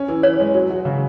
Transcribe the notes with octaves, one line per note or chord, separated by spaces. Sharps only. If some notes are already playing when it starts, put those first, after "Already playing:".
Already playing: C#4
E3
E3 C#5
G#3
F#3
F#4
C#3